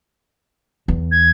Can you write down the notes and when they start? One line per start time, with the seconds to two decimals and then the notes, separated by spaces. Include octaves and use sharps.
0.88 E2
1.11 G#6